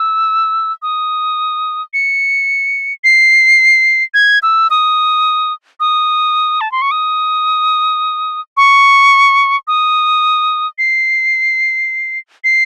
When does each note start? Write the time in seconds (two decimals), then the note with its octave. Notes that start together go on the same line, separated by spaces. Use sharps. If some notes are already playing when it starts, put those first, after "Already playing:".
Already playing: E6
0.82 D#6
1.94 C#7
3.04 C7
4.14 G#6
4.43 E6
4.70 D#6
5.80 D#6
6.61 A5
6.72 C6
6.82 C#6
6.91 D#6
8.57 C#6
9.68 D#6
10.78 C7
12.44 C7